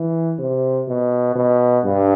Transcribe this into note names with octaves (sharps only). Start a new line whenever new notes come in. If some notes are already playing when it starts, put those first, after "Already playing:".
Already playing: E3
C3
B2
B2
G2